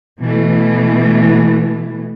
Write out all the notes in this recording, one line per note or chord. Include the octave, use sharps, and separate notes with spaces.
B2 E3 A3